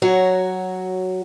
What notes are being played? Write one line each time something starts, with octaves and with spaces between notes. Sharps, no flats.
F#3 F#4 C#5